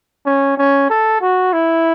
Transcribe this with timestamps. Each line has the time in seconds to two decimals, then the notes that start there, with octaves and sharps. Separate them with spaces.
0.26 C#4
0.57 C#4
0.90 A4
1.21 F#4
1.53 E4